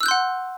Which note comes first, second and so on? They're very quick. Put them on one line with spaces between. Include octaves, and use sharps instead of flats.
E6 F#6 G6 C6 F#5